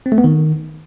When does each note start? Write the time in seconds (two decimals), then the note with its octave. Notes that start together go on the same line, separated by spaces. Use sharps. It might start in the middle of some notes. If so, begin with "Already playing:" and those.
0.06 C4
0.12 A3
0.18 B3
0.24 D#3